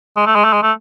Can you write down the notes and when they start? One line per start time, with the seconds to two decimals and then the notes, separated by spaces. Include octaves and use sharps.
0.16 G#3
0.26 A3
0.35 G#3
0.44 A3
0.53 G#3
0.62 A3